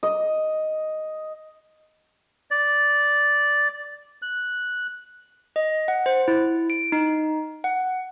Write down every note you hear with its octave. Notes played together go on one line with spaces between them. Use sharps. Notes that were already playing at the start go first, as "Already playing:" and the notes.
D#5
D5
F#6
D#5
F#5
C5
E4
D7
D#4
F#5